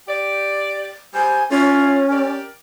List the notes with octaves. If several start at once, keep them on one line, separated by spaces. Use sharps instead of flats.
G4 D5
G3 C5 G#5
A3 C#4 E4 F4
G4 A#4 D5